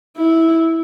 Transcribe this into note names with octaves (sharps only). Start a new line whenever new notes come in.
E4